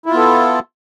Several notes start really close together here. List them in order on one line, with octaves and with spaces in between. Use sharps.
E4 F4 B3 A4